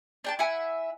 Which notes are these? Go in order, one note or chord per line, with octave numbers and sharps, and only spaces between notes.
D4 G5 A5
E4 E5 F#5 G#5